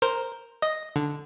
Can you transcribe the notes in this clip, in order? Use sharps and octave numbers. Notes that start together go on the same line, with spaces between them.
A#4 C5
D#5
D3